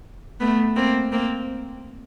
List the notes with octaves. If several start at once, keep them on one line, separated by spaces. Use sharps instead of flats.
A3 B3
A#3 C4
A#3 C4